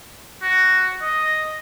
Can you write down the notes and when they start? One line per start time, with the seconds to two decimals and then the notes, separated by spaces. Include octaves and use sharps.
0.42 F#4
1.01 D#5